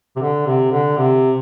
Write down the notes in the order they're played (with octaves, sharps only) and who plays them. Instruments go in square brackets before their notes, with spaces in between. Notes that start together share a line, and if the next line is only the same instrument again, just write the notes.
[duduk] C3
D3
C3
D3
C3